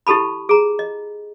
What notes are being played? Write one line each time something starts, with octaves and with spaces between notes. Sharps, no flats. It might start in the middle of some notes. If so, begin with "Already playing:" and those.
E4 G4 A4 A5 B5
G#4 A#5
D#5